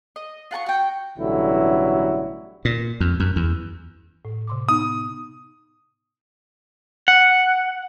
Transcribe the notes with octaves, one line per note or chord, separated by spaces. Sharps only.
D#5
F4 F#5 A5 C#6
F#4 G5
A1 B2 D3 F#3 G3 E4
A#2
F2
F#2
E2
A2
C3 C6 D6
B3 D#4 D#6
F#5